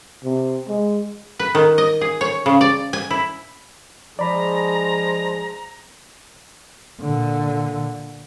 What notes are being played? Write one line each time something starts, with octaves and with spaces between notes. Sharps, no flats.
C3
G#3
B4
D#3
D#5
G#4
C#5
C#3
D5
G#5
E4
F3 G#3 D4 G#4 D5 A#5 B5
A#2 D3